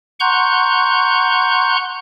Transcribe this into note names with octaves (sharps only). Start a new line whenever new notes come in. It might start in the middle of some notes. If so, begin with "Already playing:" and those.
F#5 A#5 C6 C#6 F#6 G6